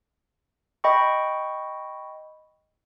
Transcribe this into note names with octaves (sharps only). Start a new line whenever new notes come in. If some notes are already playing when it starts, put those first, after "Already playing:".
D#5 G5 B5 C#6